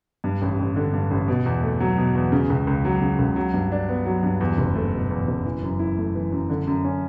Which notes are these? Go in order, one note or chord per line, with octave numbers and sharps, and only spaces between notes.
G2
A1
A1
D3
G2
A1
B2
E2
A3
F#3
B2
E2
C#3
C#2
C#2
F#3
C#3
C#2
F#3
G2
D4
B3
F#3
G2
E2
F#1
A3
B2
E2
F#1
E3
F#2
E4
A3
E3
F#2
D3
F#2
C#4